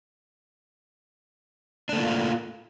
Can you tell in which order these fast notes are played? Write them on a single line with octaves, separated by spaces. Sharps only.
D4 A3 A#3 F4